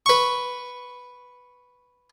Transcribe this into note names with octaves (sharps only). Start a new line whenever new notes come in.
B4 C#6